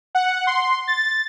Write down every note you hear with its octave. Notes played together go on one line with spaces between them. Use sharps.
F#5
C6
A6